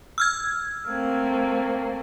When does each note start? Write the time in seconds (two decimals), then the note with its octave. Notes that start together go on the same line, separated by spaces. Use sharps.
0.18 E6 F6 G#6
0.89 A3 A#3 C4